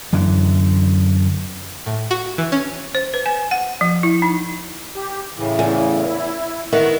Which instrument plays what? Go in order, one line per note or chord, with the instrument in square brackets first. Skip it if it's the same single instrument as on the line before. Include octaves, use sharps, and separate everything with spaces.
[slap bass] F#2 D3 E3
[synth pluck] A2
F#4
E3
C#4
[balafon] C5
B4
G#5
F#5
F3
E4
D#4
[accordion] G4
A2 C#3 E3
[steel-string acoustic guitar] E2
[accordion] E4
[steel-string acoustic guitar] D#3 B3 E4 [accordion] F#5 C#6